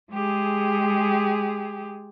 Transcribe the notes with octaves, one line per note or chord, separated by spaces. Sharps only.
G#3 G4 G#4